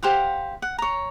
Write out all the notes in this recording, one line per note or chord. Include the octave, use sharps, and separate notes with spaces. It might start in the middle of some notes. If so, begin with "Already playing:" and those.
G4 C5 F5 F#5
F#5
C#5 A#5